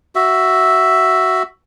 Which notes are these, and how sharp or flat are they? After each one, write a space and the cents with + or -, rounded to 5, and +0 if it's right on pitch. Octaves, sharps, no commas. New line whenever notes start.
F#4 +10 E5 +0